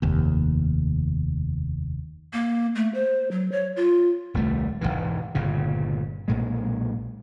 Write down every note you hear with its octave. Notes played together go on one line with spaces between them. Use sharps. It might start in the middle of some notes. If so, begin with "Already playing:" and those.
F1 D#2
A#3
A3
C5
F#3
C#5
F4
D#1 C2 G3 A3
E1 A#1 G#2 E3
G1 A#2 C#3
B1 A#2 G#3